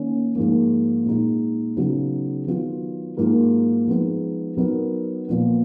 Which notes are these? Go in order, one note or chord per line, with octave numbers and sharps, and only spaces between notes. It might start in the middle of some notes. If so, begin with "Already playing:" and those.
Already playing: D#3 A#3 C#4
G#2 F3 A#3
A#2 G#3 D#4
C#3 F#3 B3 D#4
D#3 F#3 B3 F4
G#2 F#3 A#3 F4 A#4
F3 G#3 B3 D#4
F#3 B3 D#4 A#4
A#2 F3 B3